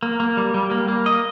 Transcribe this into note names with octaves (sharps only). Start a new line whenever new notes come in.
A#3
A#3
G3
G3
A#3
A#3
D#5